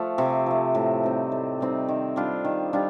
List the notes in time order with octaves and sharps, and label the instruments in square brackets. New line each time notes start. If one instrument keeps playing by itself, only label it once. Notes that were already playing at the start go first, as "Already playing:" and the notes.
Already playing: [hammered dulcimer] F3 A3
C3
F3 A3
A2
G3 C4 D#4
A2
G3 C4 D#4
D#3
G3 D4 F4
D#3
G3 D4 F4